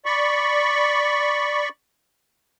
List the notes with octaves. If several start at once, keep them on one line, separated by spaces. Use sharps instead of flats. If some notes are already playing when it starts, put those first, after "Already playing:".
D5 B5 C#6